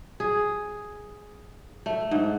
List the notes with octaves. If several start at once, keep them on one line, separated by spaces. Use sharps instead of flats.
G#4
A3
G#2